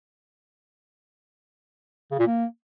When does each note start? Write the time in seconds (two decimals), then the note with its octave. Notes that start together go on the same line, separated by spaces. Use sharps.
2.11 C#3
2.19 A#2
2.27 A#3